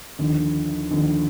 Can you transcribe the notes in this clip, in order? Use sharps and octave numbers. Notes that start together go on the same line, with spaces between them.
D#2 D3 F3
D#2 D3 F3